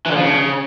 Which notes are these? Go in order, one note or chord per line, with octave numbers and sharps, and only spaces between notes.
E3
D3
F3
C#3